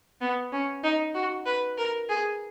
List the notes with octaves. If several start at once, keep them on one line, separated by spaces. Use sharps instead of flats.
B3
C#4
D#4
F#4
B4
A#4
G#4